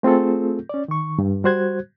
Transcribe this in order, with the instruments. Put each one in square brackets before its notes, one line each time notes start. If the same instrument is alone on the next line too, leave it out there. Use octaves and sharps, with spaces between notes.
[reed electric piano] A3 C4 F4 G#4 A4
C#4 D5
D#3 C#6
G2
G3 F#4 C5 F#6 G#6